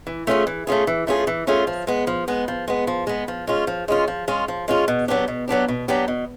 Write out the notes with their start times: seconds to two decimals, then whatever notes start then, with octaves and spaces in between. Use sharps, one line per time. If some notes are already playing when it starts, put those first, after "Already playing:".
0.07 E3
0.27 A3 C#4 F4 G#4
0.47 E3
0.67 A3 C#4 F4 G#4
0.87 E3
1.07 A3 C#4 F4 G#4
1.27 E3
1.47 A3 C#4 F4 G#4
1.67 F3
1.87 G#3 B3
2.07 F3
2.28 G#3 B3
2.48 F3
2.68 G#3 B3
2.87 F3
3.07 G#3 B3
3.28 F3
3.47 G#3 C#4 F4
3.67 F3
3.88 G#3 C#4 F4
4.08 F3
4.28 G#3 C#4 F4
4.48 F3
4.68 G#3 C#4 F4
4.88 B2
5.08 F#3 B3 D4 G4
5.28 B2
5.48 F#3 B3 D4 G4
5.68 B2
5.88 F#3 B3 D4 G4
6.08 B2